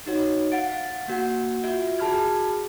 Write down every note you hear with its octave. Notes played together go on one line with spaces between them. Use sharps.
D#4 F#4 C#5
F5 F#5 A6 D7
F5
A#3 F#4 F#5
F4 F#4 E5
F#4 G#4 A5 B5 F6 G#6